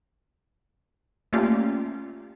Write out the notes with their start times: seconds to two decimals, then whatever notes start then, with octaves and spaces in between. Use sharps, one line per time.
1.33 A3 A#3 C#4 F4 G4 D5